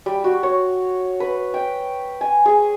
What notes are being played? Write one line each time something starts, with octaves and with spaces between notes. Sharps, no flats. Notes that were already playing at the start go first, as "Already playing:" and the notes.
G3
F#4
C#5
B4
G5
G#5
G#4